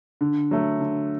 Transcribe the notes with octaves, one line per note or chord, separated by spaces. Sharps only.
D3
F#3 A3
D3